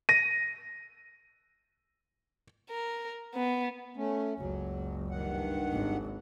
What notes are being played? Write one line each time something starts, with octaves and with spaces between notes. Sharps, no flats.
A#6 D#7
A#4
B3
A3 C#4
F#1 C#2 F#3
G2 D#3 F#5
G#1